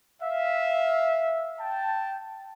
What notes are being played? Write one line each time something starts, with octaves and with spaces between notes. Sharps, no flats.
E5 F5
G5 A5